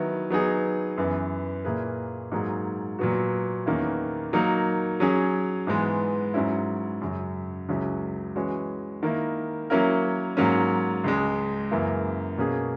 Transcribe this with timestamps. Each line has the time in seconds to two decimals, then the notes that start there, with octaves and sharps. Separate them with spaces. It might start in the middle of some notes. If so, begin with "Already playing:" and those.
Already playing: D#3 F#3 B3 E4
0.30 F#3 B3 D#4 G#4
0.98 F#2 E3 B3
1.64 A#2 A#3 E4 G#4 B4
2.32 G#2 F#3 A#3 D#4 G#4
2.99 A#2 F#3 B3 F#4
3.66 E2 D#3 A#3 C#4 E4
4.33 F#3 A#3 D#4 A#4
5.00 F#3 C#4 G#4
5.67 G#2 E3 G#3 B3
6.34 G#2 F#3 C#4 E4
7.01 F#2 C#3 F#3
7.69 C#2 C#3 F#3 C#4 E4
8.36 E3 G#3 C#4 F#4 C#5
9.03 D#3 A#3 E4
9.70 F#3 A#3 C#4 E4 A#4
10.37 G#2 F#3 A#3 C#4
11.04 C#2 C#3 G#3
11.71 F#2 C#3 E3 A#3 E4
12.38 B2 A#3 C#4 G#4